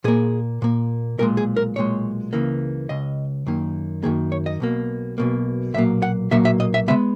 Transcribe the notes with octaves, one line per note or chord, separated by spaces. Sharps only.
A#2 A#3 G#4
A#2 A#3
B1 A#2 G#3 A#4
G#4
A#4
B1 A#2 G#3 C#5
C#2 C#3 E3 A#3
C#2 C#3 D#5
F#2 D#3 A#3
F#2 D#3 A#3 G#4
C#5
D#5
B1 B2 A#3
B1 B2 A#3
B1 A#2 F#3 A#3 E5
F#5
B1 A#2 F#3 A#3 E5
E5
D#5
E5
C#3 G#3 B3 E5